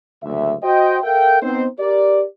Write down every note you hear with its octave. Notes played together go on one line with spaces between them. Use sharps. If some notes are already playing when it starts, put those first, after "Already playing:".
F#1 D2 E5
F#4 C5 D#5 G5
A4 A#4 E5 F5 G5
B3 C4 D#4 C5
G4 A#4 D5